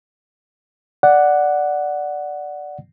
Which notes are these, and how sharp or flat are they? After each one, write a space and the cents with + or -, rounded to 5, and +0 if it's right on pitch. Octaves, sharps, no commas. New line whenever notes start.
D5 +0 F#5 +0